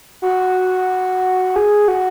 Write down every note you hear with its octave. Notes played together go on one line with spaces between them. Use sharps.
F#4
G#4
F#4